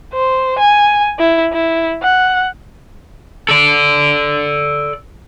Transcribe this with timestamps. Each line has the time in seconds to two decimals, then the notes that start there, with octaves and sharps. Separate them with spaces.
0.13 C5
0.59 G#5
1.19 E4
1.53 E4
2.03 F#5
3.49 A4 D5